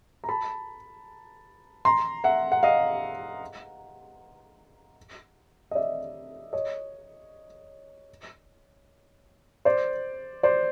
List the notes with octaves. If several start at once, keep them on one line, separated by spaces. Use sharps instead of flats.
A#5
A5 B5
A#5 C6
E5 F#5
F#5
D#5 F5
D#5
D5 E5
C#5 D#5
C5 D5
C5 D5